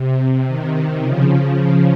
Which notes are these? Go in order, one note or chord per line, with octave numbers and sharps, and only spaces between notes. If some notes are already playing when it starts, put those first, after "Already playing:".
Already playing: C3
C3 D#3
C#3 F3